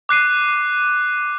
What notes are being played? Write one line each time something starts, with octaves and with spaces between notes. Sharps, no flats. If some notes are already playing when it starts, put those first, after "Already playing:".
D6 F#6 C7 D#7